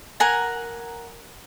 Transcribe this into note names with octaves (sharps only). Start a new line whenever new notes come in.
A#4 F#5 G#5 A#5